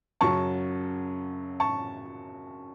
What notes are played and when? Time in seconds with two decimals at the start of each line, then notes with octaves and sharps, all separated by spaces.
0.21 F#2 C#3 F#3 A5 C#6
1.60 A5 C#6